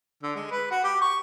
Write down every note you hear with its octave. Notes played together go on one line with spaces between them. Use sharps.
D3
G#3
B4
F#4
G4
C#6